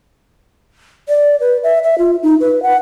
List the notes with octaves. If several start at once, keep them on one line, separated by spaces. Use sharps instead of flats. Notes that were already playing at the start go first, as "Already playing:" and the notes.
D5
B4
E5
E5
F4
D#4
B4
F#5